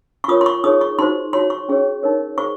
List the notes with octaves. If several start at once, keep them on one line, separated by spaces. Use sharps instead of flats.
C#6
F4 A#4 C#5 D#6
C6
C#6
D#4 G#4 C#5 D#6
C#6
D#4 F#4 C5 C6
D#4 F#4 C#5 C6
C#6
C#4 G#4 C#5
D#4 A#4 C#5
G#4 C5 C#6